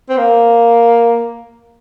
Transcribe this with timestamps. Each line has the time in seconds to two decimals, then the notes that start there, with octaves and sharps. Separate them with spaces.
0.09 C4
0.18 A#3